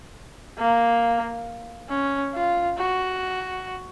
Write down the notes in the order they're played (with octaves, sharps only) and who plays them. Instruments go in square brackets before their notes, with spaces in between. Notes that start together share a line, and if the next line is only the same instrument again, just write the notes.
[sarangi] A#3
C#4
F4
F#4